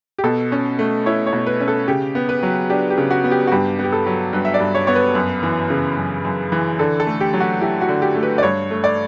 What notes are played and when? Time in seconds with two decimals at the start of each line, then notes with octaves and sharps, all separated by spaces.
0.18 G4
0.24 B2 A4
0.52 C#4
0.79 A3
1.06 E4 C#5
1.27 C#5
1.33 B2
1.47 B4
1.61 C#4
1.68 A4
1.88 C#3 G4
2.15 B3
2.29 B4
2.43 F#3
2.70 D4 G4
2.90 G4
2.97 C#3
3.11 F#4
3.24 B3
3.31 G4
3.47 F#4
3.52 G2 G4
3.79 B3
3.84 G4
3.92 A4
4.06 F#3
4.33 G2 B4
4.45 E5
4.54 D5
4.60 G2
4.75 C#5
4.87 B3 C#5
4.96 B4
5.15 F#2
5.43 E3
5.70 C#3
5.97 F#2
6.25 F#2
6.52 E3
6.79 D3 A4
7.00 A4
7.07 A3
7.21 G4
7.33 F#3
7.40 F#4
7.61 E4 G4
7.81 F#4
7.88 D3
8.02 G4
8.15 A3
8.23 B4
8.38 D5
8.43 G2 C#5
8.71 A3
8.84 D5